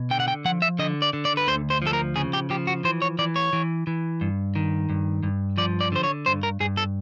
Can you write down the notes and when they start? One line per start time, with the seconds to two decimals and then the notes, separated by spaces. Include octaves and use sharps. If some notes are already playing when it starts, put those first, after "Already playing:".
Already playing: B2
0.11 D3 G5
0.20 F#5
0.28 G5
0.45 F3 F#5
0.62 E5
0.79 D3 D#5
1.02 D5
1.13 D3
1.25 D5
1.37 B4
1.48 D2 C5
1.70 C5
1.82 F3 A4
1.93 A#4
2.16 C#3 G#4
2.33 G4
2.50 F3 G4
2.67 F#4
2.84 E3 C5
3.02 C#5
3.19 E3 D5
3.36 C#5
3.53 E3
3.87 E3
4.21 G2
4.56 D#3
4.90 G2
5.23 G2
5.58 F3 D5
5.81 D5
5.92 D3 C5
6.04 C#5
6.26 G2 C5
6.43 A#4
6.60 G2 G#4
6.77 A4